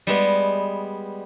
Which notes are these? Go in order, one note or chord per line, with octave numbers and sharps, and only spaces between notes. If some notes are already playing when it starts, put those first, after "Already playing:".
G3 G#3 B3